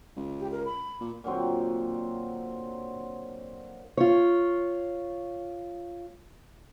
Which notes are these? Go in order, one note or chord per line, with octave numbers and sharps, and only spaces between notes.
C#2
G4
A#4
B5
A#2
A#2 D3 F#3 C4
F4 C#5